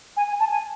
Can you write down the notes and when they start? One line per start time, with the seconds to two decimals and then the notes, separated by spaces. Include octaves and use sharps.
0.17 G#5
0.28 G#5
0.40 A5
0.51 G#5